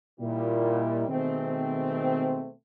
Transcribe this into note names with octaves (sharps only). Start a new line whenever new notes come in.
A#2 D#3 G3 E4
B2 D#3 G#3 A3 C4